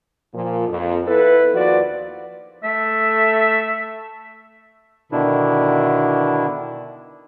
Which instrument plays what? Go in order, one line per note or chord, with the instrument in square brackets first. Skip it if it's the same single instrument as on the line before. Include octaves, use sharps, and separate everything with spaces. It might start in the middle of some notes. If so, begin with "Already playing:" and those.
[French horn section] A#2 F3
F2
B3 E4 A4 B4
D#2 F3 F#4 B4 D5
[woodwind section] A3 E5
[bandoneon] B2 D3 D#3 D4 E4